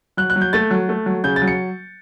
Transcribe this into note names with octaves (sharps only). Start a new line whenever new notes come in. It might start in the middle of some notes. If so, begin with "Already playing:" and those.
F#3 F#6
F#6
F#3
G6
A3 A6
F#3
A3
F#3
C#3 G6
A6
F#3
C#7